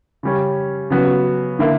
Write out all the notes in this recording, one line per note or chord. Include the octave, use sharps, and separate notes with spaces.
C#3 G3 C#4
C#3 F#3 B3 F#4
D3 A#3 E4